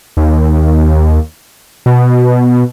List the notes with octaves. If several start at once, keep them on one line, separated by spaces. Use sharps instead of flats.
D#2
B2